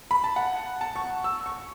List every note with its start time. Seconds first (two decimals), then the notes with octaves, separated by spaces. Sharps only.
0.11 B5
0.24 A5
0.36 F#5
0.81 A5
0.96 C#6
1.24 E6
1.46 C#6